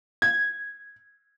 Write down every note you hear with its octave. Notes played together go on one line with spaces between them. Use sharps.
G#6